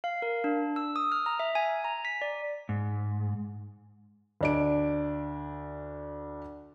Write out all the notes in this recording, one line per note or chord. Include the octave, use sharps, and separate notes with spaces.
F5
A#4
D4
E6
D#6
F6
A#5
E5
G#5
A#5
B6
D5
G#2
D2 D4 D7